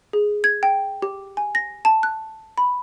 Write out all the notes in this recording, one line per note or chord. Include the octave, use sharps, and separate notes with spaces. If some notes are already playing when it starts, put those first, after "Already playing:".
G#4
G#6
G5
G4
G#5
A#6
A5
F#6
B5